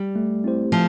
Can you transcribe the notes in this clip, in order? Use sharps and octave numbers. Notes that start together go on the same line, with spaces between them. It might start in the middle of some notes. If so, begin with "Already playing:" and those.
Already playing: G3
A3
C4 E4 G4 C5
F3 A3